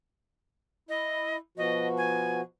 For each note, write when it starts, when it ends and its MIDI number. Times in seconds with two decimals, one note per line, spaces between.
0.89 1.37 64
0.89 1.37 75
1.58 2.41 47
1.58 2.41 53
1.58 2.41 66
1.58 1.87 75
1.98 2.40 80